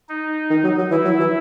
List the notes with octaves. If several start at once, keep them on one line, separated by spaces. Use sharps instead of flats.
D#4
D#3
F#3
F#3
E3 E4
F#3
E3